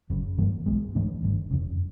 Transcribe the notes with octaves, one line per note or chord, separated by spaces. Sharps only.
F#1 F#2 C#3
G2 E3 G3 A#3
B1 B2 G#3
G#2 E3 A3 D4
G#1 G2 D3
F1 F2 C#3